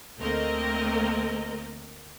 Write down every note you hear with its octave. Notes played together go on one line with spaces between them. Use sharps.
D2 A3 A#3 C4 A#4 D#5